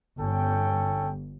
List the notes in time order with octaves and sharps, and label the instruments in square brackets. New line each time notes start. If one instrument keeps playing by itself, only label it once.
[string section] G1 [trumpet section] C#4 A4 G5